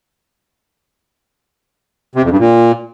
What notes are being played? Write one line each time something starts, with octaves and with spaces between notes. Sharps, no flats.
C3
F2
G2
A#2